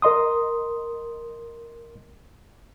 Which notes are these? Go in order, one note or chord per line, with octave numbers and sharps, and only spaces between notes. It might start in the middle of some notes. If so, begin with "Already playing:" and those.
A#4 D#5 C6 D#6